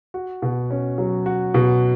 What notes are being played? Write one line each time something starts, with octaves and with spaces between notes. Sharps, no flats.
F#4
B2
C#4
F#3
F#4
B2